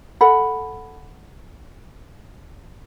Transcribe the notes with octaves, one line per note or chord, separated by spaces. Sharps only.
A4 F#5 B5